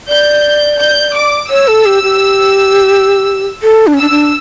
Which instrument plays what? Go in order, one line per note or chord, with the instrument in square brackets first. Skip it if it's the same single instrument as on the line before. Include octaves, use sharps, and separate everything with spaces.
[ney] D5 [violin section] G6
[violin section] G6
D6
[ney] C#5 [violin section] E6
[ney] A4
G4
G4
A4
D4
C#4
[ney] D4 [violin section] E6
[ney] D4